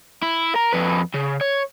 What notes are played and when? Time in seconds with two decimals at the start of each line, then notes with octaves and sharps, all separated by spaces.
0.22 E4
0.55 A#4
0.73 F2 B4
1.14 C#3
1.41 C#5